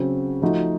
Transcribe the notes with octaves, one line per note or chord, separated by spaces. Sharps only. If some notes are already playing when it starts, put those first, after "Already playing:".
Already playing: C#3 F#3 C4 F#4
F3 A3 D#4 F#4